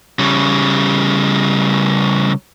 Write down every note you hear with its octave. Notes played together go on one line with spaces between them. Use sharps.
C#3 G3